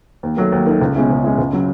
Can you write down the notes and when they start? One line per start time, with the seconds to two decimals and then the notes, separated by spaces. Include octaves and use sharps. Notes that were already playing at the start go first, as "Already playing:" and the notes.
0.23 D#2
0.37 D#3 F#3 A3
0.52 D#2
0.66 D#3 F#3 A3
0.81 C#2
0.96 B2 G#3 C#4 E4
1.10 C#2
1.24 B2 G#3 C#4 E4
1.38 C#2
1.53 C#3 F#3